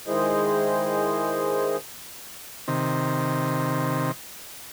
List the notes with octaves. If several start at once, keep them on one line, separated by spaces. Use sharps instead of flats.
D#3 G#3 E4 G#4 C5 D#5
C3 D#3